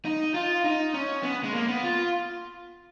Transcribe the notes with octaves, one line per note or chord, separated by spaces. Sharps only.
D#4
F4
D#4
C#4
B3
G#3
A#3
B3
F4